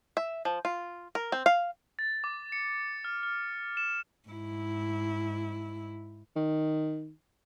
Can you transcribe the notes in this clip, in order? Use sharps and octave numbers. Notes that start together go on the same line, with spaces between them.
E5
F3
F4
A#4
C4
F5
A6
D6
C#7
F6
F6
E7
G#2 E4
D#3